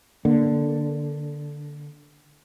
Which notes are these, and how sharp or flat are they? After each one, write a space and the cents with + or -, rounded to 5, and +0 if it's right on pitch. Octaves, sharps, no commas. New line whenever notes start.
D3 +0 A#3 +20